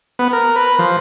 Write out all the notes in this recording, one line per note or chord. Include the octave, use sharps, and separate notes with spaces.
B3
A#4
B4
F3